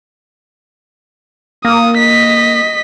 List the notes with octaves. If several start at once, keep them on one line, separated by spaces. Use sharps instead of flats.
A#3 D#6
D#5 B6